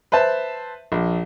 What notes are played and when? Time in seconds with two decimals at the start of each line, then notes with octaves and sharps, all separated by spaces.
0.12 B4 C5 E5 A5
0.92 A#1